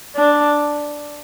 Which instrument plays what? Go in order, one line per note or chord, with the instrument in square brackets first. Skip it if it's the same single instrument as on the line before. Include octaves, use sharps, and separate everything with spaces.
[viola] D4